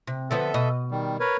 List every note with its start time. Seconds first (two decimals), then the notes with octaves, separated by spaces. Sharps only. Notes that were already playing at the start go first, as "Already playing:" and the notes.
0.07 C3
0.31 D3 F3 B3 A4 E5
0.54 B2 D#5
0.91 D#3 G3
1.20 A#4 B4 C#5